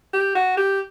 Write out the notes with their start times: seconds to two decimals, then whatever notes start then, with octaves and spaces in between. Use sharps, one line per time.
0.13 G4
0.35 F#4
0.57 G4